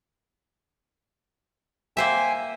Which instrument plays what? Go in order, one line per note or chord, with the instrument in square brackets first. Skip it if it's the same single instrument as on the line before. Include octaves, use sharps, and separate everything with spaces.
[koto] A#3 C5 E5 [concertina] G5 G#5